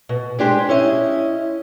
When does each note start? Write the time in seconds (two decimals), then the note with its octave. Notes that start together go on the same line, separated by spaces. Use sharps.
0.09 B2
0.39 G#3 D4 G4 C5
0.69 C#4 E4 D#5